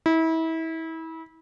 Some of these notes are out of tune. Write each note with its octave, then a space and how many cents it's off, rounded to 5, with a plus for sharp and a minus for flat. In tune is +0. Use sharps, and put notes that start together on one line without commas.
E4 -30